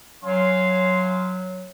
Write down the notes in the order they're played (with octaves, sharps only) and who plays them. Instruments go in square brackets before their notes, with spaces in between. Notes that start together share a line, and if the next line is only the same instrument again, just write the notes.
[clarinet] F#3 [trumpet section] C#4 F5 C6